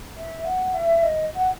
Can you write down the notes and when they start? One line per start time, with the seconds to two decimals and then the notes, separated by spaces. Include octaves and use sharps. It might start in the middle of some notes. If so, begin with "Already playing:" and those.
0.17 E5
0.45 F#5
0.74 E5
1.03 D#5
1.35 F#5